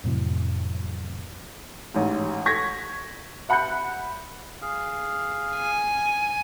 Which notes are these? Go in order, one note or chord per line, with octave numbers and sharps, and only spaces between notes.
F2 A2 C3 E3 F#3
A1 G#2
C#6 G#6 A#6 B6
E5 F#5 B5 F#6 G6 C#7
G#4 F5
G#5